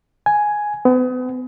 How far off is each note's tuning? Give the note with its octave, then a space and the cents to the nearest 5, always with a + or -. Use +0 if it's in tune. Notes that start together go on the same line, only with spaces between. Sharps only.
G#5 +5
B3 +40